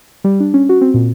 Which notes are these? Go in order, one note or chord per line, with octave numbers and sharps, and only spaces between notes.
G3
D4
C#4
F#4
C4
A#2